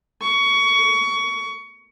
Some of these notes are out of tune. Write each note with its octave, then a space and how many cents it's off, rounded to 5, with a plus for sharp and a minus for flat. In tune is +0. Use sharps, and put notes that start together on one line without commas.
C#6 +20